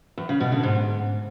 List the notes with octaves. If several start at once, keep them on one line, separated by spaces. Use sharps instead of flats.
E2
C#3
B2
D3
G#2